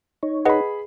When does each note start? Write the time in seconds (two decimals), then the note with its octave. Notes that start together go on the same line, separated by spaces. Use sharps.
0.23 D#4 C#5
0.45 G#4 B4 D#5 F#5 B5